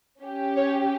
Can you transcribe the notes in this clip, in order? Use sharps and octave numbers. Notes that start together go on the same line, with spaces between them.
C#4 G4
C#5